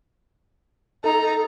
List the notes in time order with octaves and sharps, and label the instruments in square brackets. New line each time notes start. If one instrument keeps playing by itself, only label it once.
[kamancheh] D#4 A#5 [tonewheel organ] A4